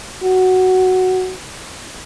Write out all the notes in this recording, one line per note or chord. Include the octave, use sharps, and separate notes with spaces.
F#4